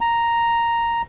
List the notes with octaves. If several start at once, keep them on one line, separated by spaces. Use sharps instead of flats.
A#5